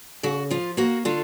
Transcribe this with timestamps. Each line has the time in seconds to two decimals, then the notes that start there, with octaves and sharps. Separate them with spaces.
0.23 C#3 F#4
0.50 F3 F4
0.77 A#3 F#4
1.05 D3 F4